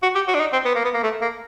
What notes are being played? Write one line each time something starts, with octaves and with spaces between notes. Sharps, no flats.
F#4
G4
F#4
D4
D#4
C4
B3
A#3
B3
A#3
A3
A#3